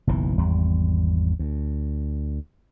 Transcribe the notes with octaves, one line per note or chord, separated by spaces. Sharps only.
F#1 B1 B2 E3
G#1 E2 G3
D2